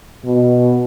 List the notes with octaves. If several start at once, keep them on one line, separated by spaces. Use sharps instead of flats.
B2